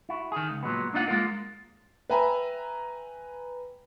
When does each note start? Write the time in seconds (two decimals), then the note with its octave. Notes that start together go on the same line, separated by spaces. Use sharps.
0.09 E4 F#4
0.32 D#3 G#4
0.50 C#2
0.63 A#2 F#3 G#3 B3
0.93 A#3 D4 D#4 F4 D#5 F#5
1.08 G#3 A#3 F4 A#4
2.10 B4 E5 G5 G#5 A#5 B5